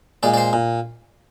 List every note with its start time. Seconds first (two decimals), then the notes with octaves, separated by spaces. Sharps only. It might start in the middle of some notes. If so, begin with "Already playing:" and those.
0.23 A#2 G#3 D5
0.34 D5
0.37 C5
0.53 A#2